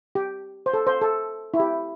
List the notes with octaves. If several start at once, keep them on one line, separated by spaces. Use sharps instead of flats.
G4
C5
A4
C5
A4
E4
G4